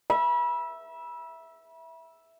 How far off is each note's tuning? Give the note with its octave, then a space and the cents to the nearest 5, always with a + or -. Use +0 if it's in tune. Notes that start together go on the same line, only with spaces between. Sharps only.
E5 +0 B5 -35